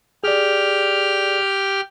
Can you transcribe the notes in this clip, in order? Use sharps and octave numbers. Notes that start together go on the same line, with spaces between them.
G4 G#4 D5 F6